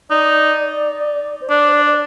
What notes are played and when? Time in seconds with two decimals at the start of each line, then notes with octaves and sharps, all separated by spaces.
0.10 D#4 D5
1.41 C5
1.50 D4 D5
1.69 C5
1.73 D5
1.86 D5